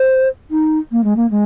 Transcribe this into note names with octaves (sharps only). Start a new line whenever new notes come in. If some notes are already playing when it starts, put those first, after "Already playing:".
Already playing: C5
D#4
A#3
G#3
A#3
G#3